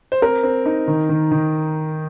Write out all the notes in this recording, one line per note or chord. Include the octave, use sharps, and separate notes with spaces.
C5
C4 A#4
C4
D#4
D#3
D#3
D#3